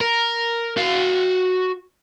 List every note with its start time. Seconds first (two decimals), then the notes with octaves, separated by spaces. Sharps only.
0.01 A#4
0.77 F#4 F5